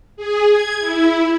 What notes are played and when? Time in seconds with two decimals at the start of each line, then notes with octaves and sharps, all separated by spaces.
0.17 G#4
0.51 G#6
0.80 E4